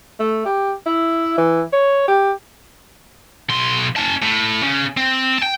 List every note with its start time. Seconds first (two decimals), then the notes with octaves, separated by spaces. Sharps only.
0.19 A3
0.45 G4
0.86 E4
1.38 E3
1.72 C#5
2.08 G4
3.50 B1 C6
3.97 C#4 A5
4.22 A2
4.63 C#3 C#4
4.97 C4
5.39 G5 A5